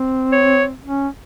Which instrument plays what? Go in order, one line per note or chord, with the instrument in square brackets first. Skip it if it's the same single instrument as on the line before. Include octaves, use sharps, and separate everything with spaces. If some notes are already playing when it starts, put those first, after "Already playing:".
Already playing: [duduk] C4
[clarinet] C#5
[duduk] C#4